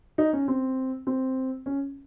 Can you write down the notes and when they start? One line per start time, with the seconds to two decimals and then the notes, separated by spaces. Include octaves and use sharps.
0.18 D#4
0.33 C#4
0.48 C4
1.07 C4
1.66 C#4